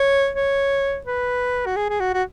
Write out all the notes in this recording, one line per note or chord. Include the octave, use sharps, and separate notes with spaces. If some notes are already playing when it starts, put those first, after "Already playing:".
Already playing: C#5
C#5
B4
F#4
G#4
G#4
F#4
F#4